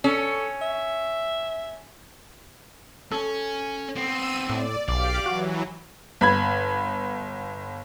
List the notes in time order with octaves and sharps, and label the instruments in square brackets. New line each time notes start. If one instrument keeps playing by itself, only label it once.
[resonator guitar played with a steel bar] C#4 [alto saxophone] A4
[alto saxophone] E5
[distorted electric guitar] C#4 [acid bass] A4
[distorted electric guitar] B3 C4 [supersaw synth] E6 D#7
[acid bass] A2 [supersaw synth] D5
[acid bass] B1 [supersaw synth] G4 F5 D6 [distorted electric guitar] D5
[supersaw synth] E3 F#3 [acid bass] F#4
[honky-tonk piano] G1 B5 G#6